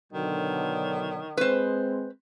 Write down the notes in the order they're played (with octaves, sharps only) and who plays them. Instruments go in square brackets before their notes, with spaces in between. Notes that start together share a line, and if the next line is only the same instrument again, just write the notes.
[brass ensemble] B2 D3 F#3 [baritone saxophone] D#3
[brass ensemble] G#3 C4 [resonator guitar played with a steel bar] B4 C5